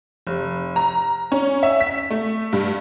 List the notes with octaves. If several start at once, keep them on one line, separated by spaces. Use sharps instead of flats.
F1
A#5
C#4
E5
B6
A3
G2